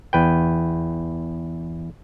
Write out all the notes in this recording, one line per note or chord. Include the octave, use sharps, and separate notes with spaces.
E2 B4 G5